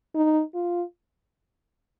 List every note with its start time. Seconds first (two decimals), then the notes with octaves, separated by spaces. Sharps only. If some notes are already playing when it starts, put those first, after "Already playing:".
0.15 D#4
0.55 F4